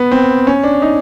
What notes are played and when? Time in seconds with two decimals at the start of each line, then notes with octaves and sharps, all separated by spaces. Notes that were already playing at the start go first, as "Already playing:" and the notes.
Already playing: B3
0.11 C4
0.47 C#4
0.64 D4
0.82 D#4